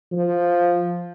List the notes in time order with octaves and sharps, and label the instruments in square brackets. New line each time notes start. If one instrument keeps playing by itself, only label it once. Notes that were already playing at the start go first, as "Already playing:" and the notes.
[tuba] F3